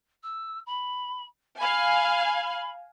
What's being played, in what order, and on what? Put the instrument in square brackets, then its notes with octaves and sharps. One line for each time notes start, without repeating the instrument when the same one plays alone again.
[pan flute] E6
B5
[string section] F5 G#5 [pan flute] B5